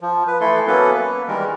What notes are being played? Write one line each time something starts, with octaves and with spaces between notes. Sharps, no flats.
F3
B4
E3 A3 E4 A4 C6
F#3 A#3 B3 C#4 A4 B4
A#3 B4
D#3 E3 G3 G#3 A#4